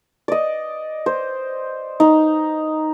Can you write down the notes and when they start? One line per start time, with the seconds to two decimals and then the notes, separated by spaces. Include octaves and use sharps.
0.28 D5 D#5
1.06 C5
2.00 D#4